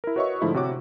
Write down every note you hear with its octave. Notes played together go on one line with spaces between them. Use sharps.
E4 A#4
F#4 B4 C#5 D#5 E5 C#6
G#2 D3 F3 A3 E4
C3 E4 F#4 C#5 D6